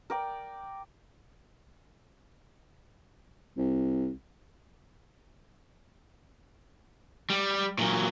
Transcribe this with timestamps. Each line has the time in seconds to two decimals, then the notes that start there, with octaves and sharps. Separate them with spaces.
0.10 A#4 D5 G5
3.57 C2
7.30 G3
7.78 A#2 F#3